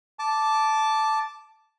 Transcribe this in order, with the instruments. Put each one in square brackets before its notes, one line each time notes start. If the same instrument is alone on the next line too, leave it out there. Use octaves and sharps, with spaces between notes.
[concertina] A5 D6